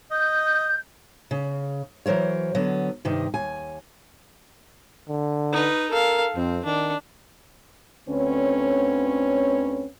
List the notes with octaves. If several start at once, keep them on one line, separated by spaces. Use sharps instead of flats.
D#5 G6
C#3
E3 F#3 A#4 C5 C#5
D3 F#3 B3
G2 C3 D#3 D#4
D#2 G#5
D3
D#4 B4
A4 A#4 F5
F2 C4
D#3 D4
D2 D3 C4 C#4 B4 C#5